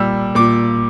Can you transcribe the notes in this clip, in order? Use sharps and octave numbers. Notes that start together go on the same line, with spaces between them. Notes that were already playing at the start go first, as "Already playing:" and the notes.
Already playing: A#2 G3 E6
A#2 D6